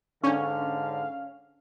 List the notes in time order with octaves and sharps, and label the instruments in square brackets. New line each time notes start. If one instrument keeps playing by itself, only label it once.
[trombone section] G#2 D3 [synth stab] C#4 [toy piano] D4 C#6 [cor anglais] F5